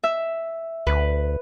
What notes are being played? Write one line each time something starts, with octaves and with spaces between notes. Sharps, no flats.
E5
D2 B4